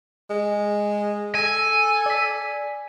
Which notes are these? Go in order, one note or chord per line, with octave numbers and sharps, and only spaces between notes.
G#3
A4 G#5
D5 B6